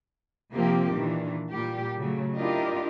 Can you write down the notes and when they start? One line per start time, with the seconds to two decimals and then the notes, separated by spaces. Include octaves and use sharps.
0.52 C3 F3 A#3 C4 G4
0.94 A#2 D#3 E3 D4
1.50 A#2 G3 G4
1.98 C#3 F#3 A3
2.36 D4 E4 F4 G4 A#4 D#5